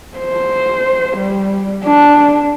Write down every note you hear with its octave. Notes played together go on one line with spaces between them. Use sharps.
C5
G3
D4